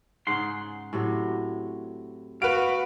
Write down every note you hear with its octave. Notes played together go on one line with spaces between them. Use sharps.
G#2 C#3 F#5 C6
A2 C3 F#3
B3 F#4 B4 F5 D7